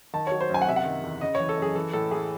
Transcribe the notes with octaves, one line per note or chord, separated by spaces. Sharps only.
D#3 A5
F#3 C#5
C5
F#2 G#5
F#5
C3 E5
F#5
D#3
E2
C#3 D#5
C#5
E3
A4
F#2 G#4
E3 A4
A2 A4
E3 G#4